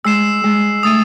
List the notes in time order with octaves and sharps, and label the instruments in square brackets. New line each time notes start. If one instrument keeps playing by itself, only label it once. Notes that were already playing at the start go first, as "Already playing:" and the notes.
[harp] G#3 [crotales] E6 C7 E7
[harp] G#3
[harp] A3 [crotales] D#6 A6 D#7